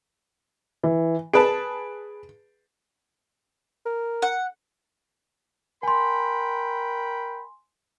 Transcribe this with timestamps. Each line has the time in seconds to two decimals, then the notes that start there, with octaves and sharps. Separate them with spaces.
0.83 E3
1.33 G#4 B4 A5 D7
3.86 A#4
4.22 F#5
5.83 A#4 G5 G#5 B5 C6